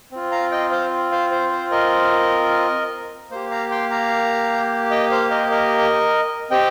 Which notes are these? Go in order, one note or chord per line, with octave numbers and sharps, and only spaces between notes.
C4 F4
F5 A#5
D#5 G5
C5 F5
C5 F5
C5
C5
A#4 D#5
A#3 G4 C5
F5 A#5
G5 C6
F5 A#5
D#5 G5
C5 F5
A#4 D#5
A#4 D#5
C4 G4 D#5 G5